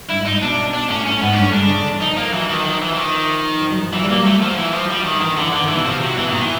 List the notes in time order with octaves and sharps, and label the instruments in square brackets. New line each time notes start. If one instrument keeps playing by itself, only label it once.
[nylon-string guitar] G2 [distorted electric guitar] E4
[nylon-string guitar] G#2
[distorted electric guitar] D#4
[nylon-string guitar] A#2
[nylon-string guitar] B2 [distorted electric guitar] D4
[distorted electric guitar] D4
[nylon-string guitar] A2 [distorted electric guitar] C#4
[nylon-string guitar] A2 [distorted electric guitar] C#4
[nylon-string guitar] G#2 [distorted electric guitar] B3
[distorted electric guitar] D4
[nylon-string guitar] G2 [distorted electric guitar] C#4
[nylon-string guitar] A2
[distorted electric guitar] D4
[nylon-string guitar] C#3
C#3
D3
E3
[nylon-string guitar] F3 [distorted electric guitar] D#4
[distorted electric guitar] A#3
[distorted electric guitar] E3 [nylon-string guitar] F#3
[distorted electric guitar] D#3
[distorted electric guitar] D#3 [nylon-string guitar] F3
[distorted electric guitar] E3
E3
D#3
[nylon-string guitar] F3
F#3
F3
[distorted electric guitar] E3 [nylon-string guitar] F#3
[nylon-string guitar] G3
[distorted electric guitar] A#3
[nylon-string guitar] F#3
[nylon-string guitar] F#3 [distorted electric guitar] A3
[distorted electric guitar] F3
E3
F3
G3
D#3
[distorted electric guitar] D#3 [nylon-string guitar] E3
[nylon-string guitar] D#3
[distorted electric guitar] D3
[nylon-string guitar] E3
[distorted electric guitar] D3 [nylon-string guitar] D#3
[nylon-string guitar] D#3
[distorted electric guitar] E3
[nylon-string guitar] B2
[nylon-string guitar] C3 [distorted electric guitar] F3
[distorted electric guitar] F#3
[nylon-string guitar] B2 [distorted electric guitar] E3
[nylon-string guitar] A#2 [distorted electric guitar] D#3
[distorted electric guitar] E3